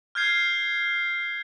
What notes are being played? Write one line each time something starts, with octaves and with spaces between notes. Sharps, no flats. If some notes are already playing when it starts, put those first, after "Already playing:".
F6 G6 G#6 C7